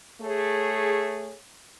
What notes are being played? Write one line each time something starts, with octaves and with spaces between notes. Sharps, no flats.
A3 G#4 C#5